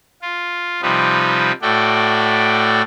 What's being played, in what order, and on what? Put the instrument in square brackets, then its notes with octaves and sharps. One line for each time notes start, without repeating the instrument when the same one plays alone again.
[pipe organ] F4
C3 F3 G3 D#4 B4
A2 A3 F#4 D5 G5